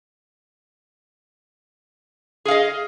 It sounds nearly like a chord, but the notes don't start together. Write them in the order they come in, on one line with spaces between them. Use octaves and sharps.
G#4 F5 D#5